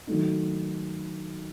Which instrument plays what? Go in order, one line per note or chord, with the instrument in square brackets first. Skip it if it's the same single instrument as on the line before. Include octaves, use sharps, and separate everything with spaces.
[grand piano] D#3 F#3 A3 D#4